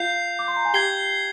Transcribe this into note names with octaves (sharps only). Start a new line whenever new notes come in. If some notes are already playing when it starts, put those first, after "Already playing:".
Already playing: F4 F5 G6 C7 F7
D6
C6
A#5
G#5
G4 G5 G#6 C7 G7